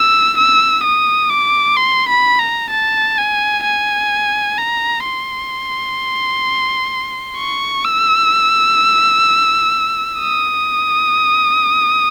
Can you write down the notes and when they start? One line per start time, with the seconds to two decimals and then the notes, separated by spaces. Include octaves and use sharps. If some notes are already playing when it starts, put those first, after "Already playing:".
Already playing: E6
0.38 E6
0.84 D#6
1.30 D6
1.77 C6
2.09 B5
2.39 A#5
2.71 A5
3.18 G#5
3.64 G#5
4.58 A#5
5.05 C6
7.38 C#6
7.85 E6
10.19 D#6